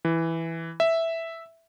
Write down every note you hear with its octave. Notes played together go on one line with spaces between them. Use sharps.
E3
E5